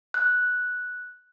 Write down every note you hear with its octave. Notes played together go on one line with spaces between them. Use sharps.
F#6